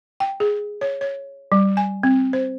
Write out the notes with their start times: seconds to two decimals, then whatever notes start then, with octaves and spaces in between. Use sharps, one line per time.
0.20 G5
0.40 G#4
0.81 C#5
1.01 C#5
1.52 G3
1.77 G#5
2.03 C4
2.33 C5